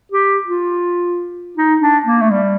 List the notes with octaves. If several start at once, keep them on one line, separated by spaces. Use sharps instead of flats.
G4
F4
D#4
D4
A#3
A3
G3